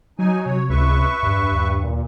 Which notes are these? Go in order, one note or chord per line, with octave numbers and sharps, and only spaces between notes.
F#3 D#4 G#5
C3 C#5
C#2 B4 E5 C#6
E2 G2
D#2
A#2